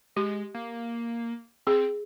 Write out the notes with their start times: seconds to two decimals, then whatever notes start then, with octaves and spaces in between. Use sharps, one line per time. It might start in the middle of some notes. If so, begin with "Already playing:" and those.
0.16 G#3 G4
0.54 A#3
1.67 C4 G#4